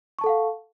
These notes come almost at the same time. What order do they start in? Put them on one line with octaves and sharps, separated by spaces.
C#6 A5 A4 F#5 F5